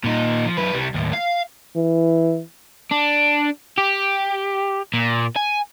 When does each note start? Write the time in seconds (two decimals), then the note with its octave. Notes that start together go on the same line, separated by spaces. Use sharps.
0.04 A#2 D#4
0.45 F3
0.57 F#2 B4
0.73 C2 G3
0.94 D#2 A2
1.13 F5
1.76 E3
2.92 D4
3.78 G4
4.94 A#2
5.36 G#5